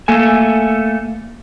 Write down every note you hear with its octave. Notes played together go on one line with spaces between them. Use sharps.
A3 A#3 A4 G#5